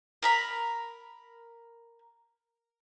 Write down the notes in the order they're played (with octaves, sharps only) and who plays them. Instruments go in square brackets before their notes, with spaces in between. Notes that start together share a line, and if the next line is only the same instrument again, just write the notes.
[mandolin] A#4 A#5 B5